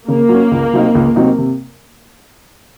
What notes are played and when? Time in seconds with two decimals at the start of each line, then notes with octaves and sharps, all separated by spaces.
0.08 C#3 A#3
0.29 F#3
0.34 C#4
0.51 C#2
0.73 C3 F#3 C4 D#4
0.95 C#2
1.16 C3 F#3 C4 D#4
1.38 C3